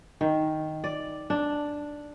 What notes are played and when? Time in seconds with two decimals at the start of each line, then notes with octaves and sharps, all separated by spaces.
0.21 D#3
0.84 D5
1.30 D4